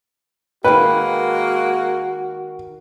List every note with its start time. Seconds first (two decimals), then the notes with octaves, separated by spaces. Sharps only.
0.64 D#3 G#3 A#3 F#4 B4 G5